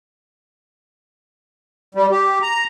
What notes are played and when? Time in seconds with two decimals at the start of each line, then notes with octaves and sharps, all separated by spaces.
1.95 G3
2.11 G4
2.42 A#5